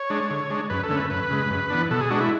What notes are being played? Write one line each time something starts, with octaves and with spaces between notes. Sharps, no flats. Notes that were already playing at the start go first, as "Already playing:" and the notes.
Already playing: C#5
G#3 D4
D3
G#3 D4
F#2 B4
A4
D3 A3 C#4
B4
F#2 B4
C#3 G#3
F#2
E3 B3 D4
B2 A4
G#4
G#3 D4 F#4
E4